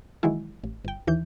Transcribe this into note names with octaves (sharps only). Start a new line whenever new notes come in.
D#3 E3 F#3 G#3 E4
A1
G1 G5
D#2 E3 G6